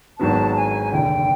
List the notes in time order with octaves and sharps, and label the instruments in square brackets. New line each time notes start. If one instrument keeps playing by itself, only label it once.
[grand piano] G#1 G#2 D#3 F#3 B3 [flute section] A5
[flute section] G#5
[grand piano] F1 D#2 D3 [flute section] G5